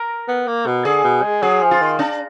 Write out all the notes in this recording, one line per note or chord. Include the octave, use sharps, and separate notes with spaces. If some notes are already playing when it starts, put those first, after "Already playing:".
Already playing: A#4
B3
A#3
B2
D3 G#4
B2
G#3
F#3 G#4
F3
F4
D#3
D4